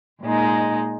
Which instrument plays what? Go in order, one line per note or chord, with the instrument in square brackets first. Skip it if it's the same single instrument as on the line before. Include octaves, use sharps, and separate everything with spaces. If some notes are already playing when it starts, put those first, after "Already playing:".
[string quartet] A#2 G#3 D#4